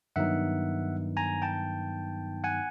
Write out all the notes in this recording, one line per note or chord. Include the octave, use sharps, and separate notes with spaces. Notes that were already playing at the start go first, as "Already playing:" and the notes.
G2 D#3 F#3 B3 D#4 E5 F#5
G#5 A#5
G5 A5
F#5 G#5